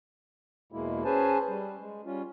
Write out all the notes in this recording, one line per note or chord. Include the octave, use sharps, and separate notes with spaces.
E2 B2 G#3 A#3 E4
C#4 G#4 B4 C5 G#5 A5
G3
G#3
G3 C#4 F4